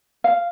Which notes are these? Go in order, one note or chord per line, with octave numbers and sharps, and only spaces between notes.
F5